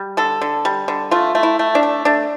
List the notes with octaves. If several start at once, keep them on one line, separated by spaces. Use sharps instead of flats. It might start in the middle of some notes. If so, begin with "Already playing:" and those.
Already playing: G3
D3 A4
D3
G3
D3
A3 F4
A3
E4
A3
D4
A3
A3 D4